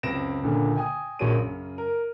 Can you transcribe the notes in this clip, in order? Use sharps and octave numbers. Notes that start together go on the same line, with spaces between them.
C#2 F#2 C4 A#6 D7 E7
C#2 A#2 D3
G5 G#5 D#6
A#1 A#3 F#4 G#4 C#5 D#7
F#2 C#3
A#4